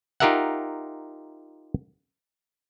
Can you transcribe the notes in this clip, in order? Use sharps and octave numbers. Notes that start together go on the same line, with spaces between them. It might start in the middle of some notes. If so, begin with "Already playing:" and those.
D#4 F4 G4 A#4 E5 F#5